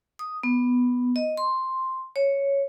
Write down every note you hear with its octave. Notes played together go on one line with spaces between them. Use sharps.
D#6
B3
D#5
C6
C#5